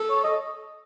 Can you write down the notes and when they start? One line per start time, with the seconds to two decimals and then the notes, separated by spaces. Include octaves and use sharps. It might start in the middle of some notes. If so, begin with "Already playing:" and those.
Already playing: A4
0.10 C#5
0.24 D#5